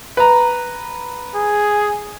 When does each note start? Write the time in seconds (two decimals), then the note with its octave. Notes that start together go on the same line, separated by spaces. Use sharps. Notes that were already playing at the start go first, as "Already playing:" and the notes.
0.17 B4 A#5
1.36 G#4